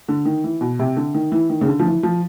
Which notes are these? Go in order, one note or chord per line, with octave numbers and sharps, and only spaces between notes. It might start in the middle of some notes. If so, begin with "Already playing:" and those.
D3
D#3
E3
B2
C3
D3
D#3
E3
D#3
C#3
D3
F3
E3
F3